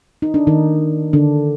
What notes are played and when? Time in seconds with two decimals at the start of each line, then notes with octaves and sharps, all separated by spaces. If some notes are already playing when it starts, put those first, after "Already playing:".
0.22 D#4
0.34 D4
0.47 D#3 D#4
1.13 D3 D4